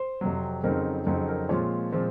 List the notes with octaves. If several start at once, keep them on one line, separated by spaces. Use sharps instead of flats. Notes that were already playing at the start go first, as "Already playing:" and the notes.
Already playing: C5
F2 C3 F#3
F2 C#3 F#3 C4 D#4 A#4
F2 C#3 F#3 C4 D#4
A#4
A#2 F3 G#3 C4 F4 C#5
A#2 F3 G#3 C4 F4